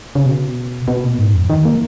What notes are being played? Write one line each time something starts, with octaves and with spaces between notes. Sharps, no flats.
C#3
B2
B2
A#2
G#2
F2
D#3
A#3